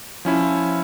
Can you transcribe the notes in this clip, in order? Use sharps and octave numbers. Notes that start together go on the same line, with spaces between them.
F3 C#4 E4